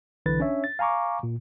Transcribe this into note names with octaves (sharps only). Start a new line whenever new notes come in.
B1 D3 E3 B4 A6
C#4 D4 C#5 E5
A6
F5 G#5 A#5 C#6 D6
A#2